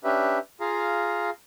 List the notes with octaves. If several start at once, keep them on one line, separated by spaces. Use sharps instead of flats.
C#4 D4 G4 B4 E5
F4 G#4 F5 A#5